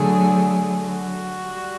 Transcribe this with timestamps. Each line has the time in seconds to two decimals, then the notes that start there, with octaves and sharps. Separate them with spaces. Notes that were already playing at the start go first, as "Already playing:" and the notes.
Already playing: D3 F#3 A3 G#4
0.88 F#4
1.47 G3